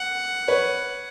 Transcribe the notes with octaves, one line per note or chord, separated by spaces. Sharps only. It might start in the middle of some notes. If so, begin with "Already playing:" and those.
Already playing: F#5
B4 C#5